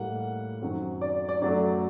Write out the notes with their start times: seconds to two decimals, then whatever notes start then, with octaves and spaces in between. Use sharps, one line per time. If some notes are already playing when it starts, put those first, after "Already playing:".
Already playing: A2 G3 A#3 F#5
0.62 F#2 D#3 F#3 C4
1.01 D5
1.29 D5
1.41 F#2 F#3 A3 D5